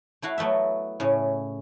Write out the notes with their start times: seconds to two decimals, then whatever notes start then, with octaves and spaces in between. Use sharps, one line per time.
0.22 A3 E4 F#4 F5
0.38 F#3 A3 B3 E5
1.00 A2 C#3 C#4